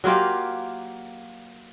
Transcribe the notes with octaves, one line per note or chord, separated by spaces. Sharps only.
F#3 A#3 F4 G4